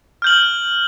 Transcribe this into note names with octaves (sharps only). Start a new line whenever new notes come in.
F6 G6 F#7